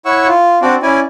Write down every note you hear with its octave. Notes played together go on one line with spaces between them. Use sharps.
E4 C#5 F#5 C#6 E6
F4
C4 D4 F#4 D5
C#4 E4 D5 G#5